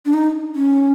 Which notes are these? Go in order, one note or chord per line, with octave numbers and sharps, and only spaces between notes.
D4
D#4
C#4